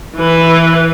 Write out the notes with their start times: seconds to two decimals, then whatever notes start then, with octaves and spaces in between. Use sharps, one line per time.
0.16 E3 B4